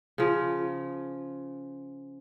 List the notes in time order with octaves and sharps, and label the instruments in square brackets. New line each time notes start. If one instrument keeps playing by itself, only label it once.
[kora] C#3 F3